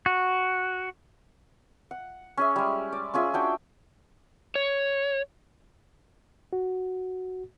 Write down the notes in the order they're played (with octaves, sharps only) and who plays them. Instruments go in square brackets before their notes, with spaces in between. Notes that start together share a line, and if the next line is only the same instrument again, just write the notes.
[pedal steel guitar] F#4
[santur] F#5
C#4 G#4 E5
G3 G#3
D5
C#4 F4 G#4 E5
D4 F#4 G5
[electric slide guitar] C#5
[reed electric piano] F#4